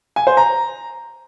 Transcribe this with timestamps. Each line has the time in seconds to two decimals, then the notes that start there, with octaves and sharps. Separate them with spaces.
0.16 G#5
0.27 C5
0.37 A#5